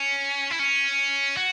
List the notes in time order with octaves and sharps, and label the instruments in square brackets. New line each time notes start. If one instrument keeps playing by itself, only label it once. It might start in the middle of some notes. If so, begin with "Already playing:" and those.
Already playing: [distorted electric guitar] C#4
E4
C#4
F#4